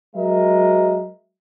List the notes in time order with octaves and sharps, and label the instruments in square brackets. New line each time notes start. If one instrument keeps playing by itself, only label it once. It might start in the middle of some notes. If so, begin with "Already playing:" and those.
[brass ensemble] F#3 G#3 A#4 D#5 E5